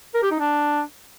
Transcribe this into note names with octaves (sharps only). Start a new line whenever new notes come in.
A#4
G4
D#4
D4